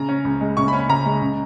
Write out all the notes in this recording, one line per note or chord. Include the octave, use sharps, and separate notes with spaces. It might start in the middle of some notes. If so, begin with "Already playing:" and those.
Already playing: C#3 A#5
C#4
C#2
G#3
C#3 C#6
B5
C#4
B5
C#2 A#5
G#3
C#3